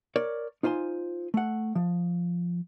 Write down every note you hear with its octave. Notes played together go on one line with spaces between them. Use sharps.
A#4 C#5 D5
D#4 F4 C5 G#5 C6
A3 F#5
F3